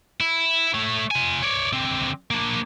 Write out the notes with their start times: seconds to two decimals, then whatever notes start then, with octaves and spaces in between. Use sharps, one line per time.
0.20 E4
0.74 A3 C#5
1.11 F4 G#5
1.42 C#5 D5
1.73 D3 C4
2.31 A#3 D4